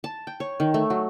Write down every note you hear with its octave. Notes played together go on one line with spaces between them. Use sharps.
A5
G5
C#5
D#3
A3
F#3